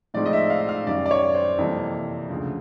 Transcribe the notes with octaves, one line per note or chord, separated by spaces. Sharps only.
A2 F3 G#3 C4 D#4 D5
D#5
E5
F5
F5
F#2 D#3 G3 D5
D5
C#5
C5
F2 C3 E3 G3 A#3
D2 C#3 F3